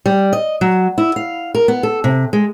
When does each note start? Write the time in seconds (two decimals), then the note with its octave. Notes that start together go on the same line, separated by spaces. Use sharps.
0.06 G3
0.33 D#5
0.61 F#3
0.98 E4
1.16 F5
1.55 A#4
1.68 B3
1.83 A4
2.04 C3
2.33 G#3